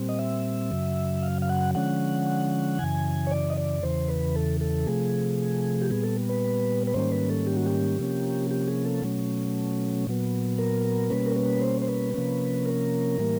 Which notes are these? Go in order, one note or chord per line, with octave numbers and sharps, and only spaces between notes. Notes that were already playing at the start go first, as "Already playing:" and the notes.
Already playing: A#2 G3 C4
D#5
E5
F#2 C#3 F#3
F5
F5
F#5
D3 F3 G#3 C#4 F#5
F#2 C#3 E3 G#5
C#5
D5
D#5
D5
E2 C#3 E3 C5
B4
A4
A4
C3 F3 A3 G#4
G4
A#2 G3 B3 G#4
A4
B4
B4
G#2 D#3 G3 A#3 C#4 C5
B4
A4
G4
F#4
G4
C3 F3 A#3 C#4
G4
G#4
A4
B2 F#3 A3 C#4
A#2 F#3 B3
A#4
B2 G3 A#3 C#4 B4
A#4
B4
C5
C5
B4
C3 F3 A#3 C#4
A#4
A2 E3 G3 A#3